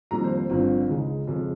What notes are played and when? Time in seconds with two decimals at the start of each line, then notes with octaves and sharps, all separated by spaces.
0.11 F2 D#3 G3 A#3 A#5
0.24 C5
0.37 C5
0.50 G1 G2 F3 C4 F4
0.89 C#2 C#3 G#3 D#4
1.27 F2 C#3 G#3